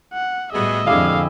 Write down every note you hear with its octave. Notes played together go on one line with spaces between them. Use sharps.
F#5
A2 G3 B3 F#4 G#4 D#5 E5
F2 D3 G#3 E4 G4 G#4 F5